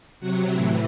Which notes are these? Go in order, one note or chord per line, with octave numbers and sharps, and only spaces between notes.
C3 F#3 F#4 F#5
A2 E3 E4 E5